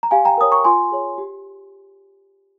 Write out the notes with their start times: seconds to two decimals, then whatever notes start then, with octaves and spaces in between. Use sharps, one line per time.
0.03 A#5
0.11 G4 F5 G#5
0.25 G5 A#5
0.37 A#4 C#5 D#6
0.51 A#5 C#6
0.64 F4 G#5 C6
0.92 G#4 C#5
1.18 G4